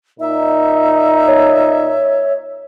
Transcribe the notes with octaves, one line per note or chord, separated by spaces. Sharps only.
A#2 D#4 E5
C#5